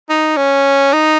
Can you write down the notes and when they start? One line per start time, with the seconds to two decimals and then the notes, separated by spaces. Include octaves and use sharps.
0.09 D#4
0.37 C#4
0.93 D#4